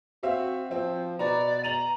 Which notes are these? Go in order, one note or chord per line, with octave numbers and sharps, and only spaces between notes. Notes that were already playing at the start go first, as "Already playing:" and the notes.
C4 F#4 E5 F5
F3 C4
B2 F#4 B4 D5 A#5
A#5 D#7 F7 F#7